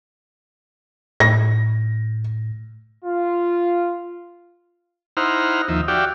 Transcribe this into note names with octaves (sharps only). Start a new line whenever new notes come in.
A2 A#6
F4
D#4 E4 C5 F#5 A#5 F6
D#2 F3 D#4 E5
F#4 G4 D5 E5 F5 G5